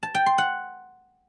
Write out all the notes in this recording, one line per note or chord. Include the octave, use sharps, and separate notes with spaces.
A5
G5
C6
F#5